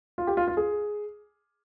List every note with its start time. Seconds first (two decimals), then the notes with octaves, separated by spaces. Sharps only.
0.18 F4
0.27 G4
0.37 F4
0.48 F4
0.57 G#4